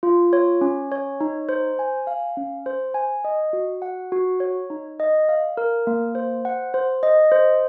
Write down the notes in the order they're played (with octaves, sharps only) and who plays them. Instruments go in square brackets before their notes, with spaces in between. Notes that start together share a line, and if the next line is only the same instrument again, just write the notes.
[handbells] F4
C#5
C#4
C#5
D#4
C5
G#5
F5
C#4
C5
G#5
D#5
F#4
F#5
F#4
C#5
D#4
D#5
F5
A#4
A#3
C5
F#5
C5
D#5
C5